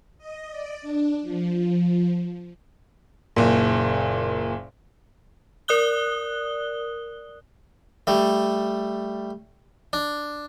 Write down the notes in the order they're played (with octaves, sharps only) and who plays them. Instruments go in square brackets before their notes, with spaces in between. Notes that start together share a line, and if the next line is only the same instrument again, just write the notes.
[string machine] D#5
D5
D4
F3
[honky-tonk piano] F#1 A#2
[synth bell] A#4 D5 D#6 F#6 G7
[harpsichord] G3 A3
D4